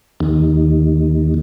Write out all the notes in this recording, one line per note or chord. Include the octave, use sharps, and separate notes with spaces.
D#2